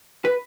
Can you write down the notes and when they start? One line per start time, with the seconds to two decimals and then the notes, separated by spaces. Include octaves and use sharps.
0.25 B4